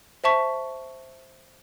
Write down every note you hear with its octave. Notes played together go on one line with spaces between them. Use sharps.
C5 E5 A5 C#6 B6